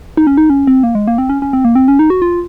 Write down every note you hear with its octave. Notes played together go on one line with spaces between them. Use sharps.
D#4
C#4
D#4
C#4
C4
A#3
G#3
A#3
C4
C#4
C#4
C4
A#3
C4
C#4
D#4
F#4
F4